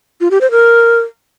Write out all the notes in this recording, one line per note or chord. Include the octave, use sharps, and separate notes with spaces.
F4
G4
C5
A#4